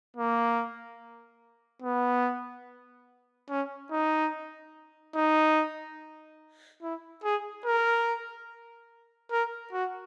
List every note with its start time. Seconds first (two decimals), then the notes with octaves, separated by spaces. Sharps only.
0.17 A#3
1.82 B3
3.49 C#4
3.91 D#4
5.15 D#4
6.82 E4
7.24 G#4
7.65 A#4
9.31 A#4
9.72 F#4